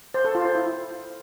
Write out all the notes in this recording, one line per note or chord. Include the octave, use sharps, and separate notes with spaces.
C5
A4
F4
C5
E4